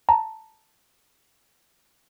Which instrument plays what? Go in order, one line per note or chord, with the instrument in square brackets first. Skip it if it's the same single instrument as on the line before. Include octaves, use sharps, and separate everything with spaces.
[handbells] A5 A#5